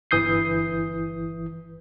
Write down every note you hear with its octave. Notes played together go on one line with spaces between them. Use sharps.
G1 E3 D#6 G6 C7